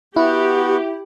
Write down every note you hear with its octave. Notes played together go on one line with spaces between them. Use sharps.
B3 E4 F#4 G4 F#5